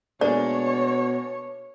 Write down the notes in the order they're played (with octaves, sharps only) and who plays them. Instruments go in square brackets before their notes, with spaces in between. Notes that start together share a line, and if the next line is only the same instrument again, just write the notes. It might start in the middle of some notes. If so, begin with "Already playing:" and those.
[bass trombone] B2 [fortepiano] G#3 A#3 D4 [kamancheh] C#5 [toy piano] D5